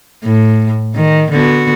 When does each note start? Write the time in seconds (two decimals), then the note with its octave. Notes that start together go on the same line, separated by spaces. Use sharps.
0.24 A2
0.95 D#3
1.32 D3 B3 F#4